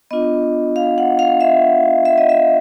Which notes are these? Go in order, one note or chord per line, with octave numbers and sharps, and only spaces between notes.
B3 D4 F4 D#5
F5
F#5
F5
E5
E5
D#5
E5